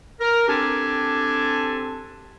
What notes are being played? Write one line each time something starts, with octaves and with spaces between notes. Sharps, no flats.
A#4
C4 D4 G4 A4 G#5 A5